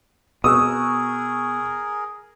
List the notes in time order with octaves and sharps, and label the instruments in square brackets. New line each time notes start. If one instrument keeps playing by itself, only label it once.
[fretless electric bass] B2 [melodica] G#4 A#4 [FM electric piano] C#6 E6 F#6 [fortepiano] D#6